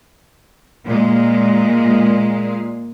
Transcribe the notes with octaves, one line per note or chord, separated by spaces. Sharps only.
A#2 G#3